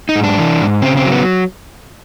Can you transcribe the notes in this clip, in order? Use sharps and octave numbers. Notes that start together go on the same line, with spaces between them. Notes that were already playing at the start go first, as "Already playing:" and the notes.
D#4
G#2
D4
E3
G#2
C#3 C4
C4
F#3
B3